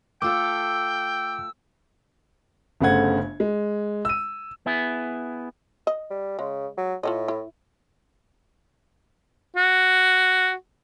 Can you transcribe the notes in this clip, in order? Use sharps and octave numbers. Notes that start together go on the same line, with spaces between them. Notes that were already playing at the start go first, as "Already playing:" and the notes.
A3 F4 A4 G5 D6 E6
G1 C#3 A3 C5 F#5 G#6
G#3
E6 D#7
B3 E4 G#4
D#5
G3
C#3 G#3
F#3
A2 F4 A4 D#5
E4
F#4